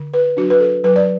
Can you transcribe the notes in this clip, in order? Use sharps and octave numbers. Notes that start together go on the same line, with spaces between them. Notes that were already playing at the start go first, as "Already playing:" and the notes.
Already playing: D3
B4
F#3 D4 F#4
B4
A4
F#3 B4
D5